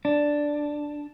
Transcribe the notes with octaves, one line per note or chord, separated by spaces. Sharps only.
D4